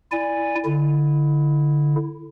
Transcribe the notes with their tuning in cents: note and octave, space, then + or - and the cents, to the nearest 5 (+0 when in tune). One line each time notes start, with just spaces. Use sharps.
E4 +0 D5 +0 G#5 -15
D3 +0 E4 +0